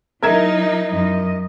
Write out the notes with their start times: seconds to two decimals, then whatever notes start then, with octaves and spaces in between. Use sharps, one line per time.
0.22 F#3 D#4 E4 A#4 E5 G#6
0.89 F#2 D#5